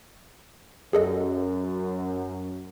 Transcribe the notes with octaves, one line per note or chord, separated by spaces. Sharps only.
F#2 G#4 A4 D#5